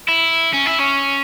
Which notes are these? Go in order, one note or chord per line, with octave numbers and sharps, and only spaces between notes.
E4
C#4
E4
C#4